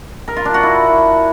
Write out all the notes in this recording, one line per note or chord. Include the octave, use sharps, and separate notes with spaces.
A#4
F4
D4
F#4
E4